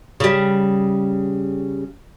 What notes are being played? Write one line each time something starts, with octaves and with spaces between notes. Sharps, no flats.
C#3 G3